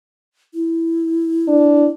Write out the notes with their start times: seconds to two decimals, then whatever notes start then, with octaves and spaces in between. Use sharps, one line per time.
0.54 E4
1.48 D4